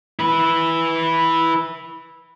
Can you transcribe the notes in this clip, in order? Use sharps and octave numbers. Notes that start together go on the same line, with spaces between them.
E4 B4